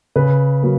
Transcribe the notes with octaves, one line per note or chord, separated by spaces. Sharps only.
C#3 B4
F#3 A#3